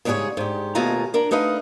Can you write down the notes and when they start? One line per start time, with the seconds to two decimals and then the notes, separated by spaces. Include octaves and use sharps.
0.05 G#2 C#3 G3 G4 G#4 C#5
0.37 G#2 G4
0.75 D#2 B2 A3 F4 G#5 A#5
1.14 D4 A#4
1.31 A3 D#4 B4 D#5 F5